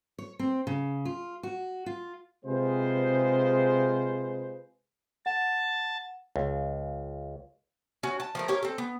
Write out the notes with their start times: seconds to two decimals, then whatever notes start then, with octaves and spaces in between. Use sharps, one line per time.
0.18 C#5
0.39 C4
0.67 C#3
1.05 F4
1.43 F#4
1.86 F4
2.45 C3 G#3 F4 G#4 B4 C5
5.26 F#5 A5
6.36 C#2
8.03 C#4 F#4
8.20 A5
8.35 F3 A3 A#4
8.48 G4 A#4 C#5 F5
8.63 C4 A4
8.78 B3